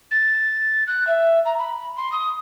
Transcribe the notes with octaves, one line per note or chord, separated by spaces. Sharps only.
A6
F#6
E5
A#5
B5
C6
D#6